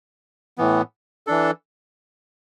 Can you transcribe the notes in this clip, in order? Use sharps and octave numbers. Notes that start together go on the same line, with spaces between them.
A2 E3 B3
E3 D4 A4